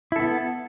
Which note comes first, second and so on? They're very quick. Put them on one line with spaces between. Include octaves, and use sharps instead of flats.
E4 A4 B3